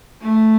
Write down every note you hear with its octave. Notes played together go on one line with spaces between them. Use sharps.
A3